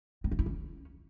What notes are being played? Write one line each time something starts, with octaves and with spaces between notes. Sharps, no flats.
C4
F4
E4
C#4